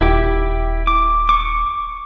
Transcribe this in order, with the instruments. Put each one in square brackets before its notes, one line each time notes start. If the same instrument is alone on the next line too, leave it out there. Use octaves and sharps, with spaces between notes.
[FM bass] D#1 [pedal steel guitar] E4 G4
[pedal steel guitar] D6
C#6 D6